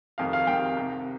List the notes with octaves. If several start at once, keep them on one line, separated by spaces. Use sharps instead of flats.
F2 C3 D#3 F5
F5
F2 C3 D#3 G5
C2 C3 D#3